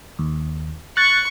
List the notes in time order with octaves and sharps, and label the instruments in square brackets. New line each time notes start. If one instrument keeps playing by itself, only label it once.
[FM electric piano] D#2
[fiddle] C#6 [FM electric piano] F#6 A6